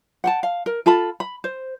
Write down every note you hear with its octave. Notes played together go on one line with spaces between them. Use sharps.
F#5 G5 A5
F5
A#4
F4 A4 A5 B5
B5
C5